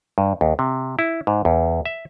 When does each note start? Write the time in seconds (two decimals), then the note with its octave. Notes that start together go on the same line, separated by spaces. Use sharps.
0.18 G2
0.41 D#2
0.59 C3
0.99 E4
1.27 G#2
1.45 E2
1.85 E5